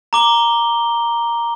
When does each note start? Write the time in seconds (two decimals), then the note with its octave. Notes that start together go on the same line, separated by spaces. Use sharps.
0.13 A#5 D6 G7